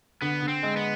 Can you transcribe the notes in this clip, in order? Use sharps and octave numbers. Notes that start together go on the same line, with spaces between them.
D3 B3
D3
C4
G#3
B3